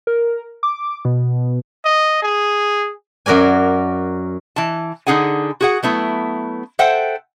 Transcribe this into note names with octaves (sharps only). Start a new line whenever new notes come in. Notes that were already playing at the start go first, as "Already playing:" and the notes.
A#4
D6
B2
D#5
G#4
F#2 F#4 A#4 D5 G#5
E3 A5
D3 D#4 G#4 F#5 G#5
F#4 G#4 F#5
F#3 A3 B3 E4
A4 C5 E5 F#5 G5